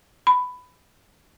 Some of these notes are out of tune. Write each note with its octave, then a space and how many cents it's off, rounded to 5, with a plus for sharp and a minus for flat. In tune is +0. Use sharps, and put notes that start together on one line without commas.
B5 +15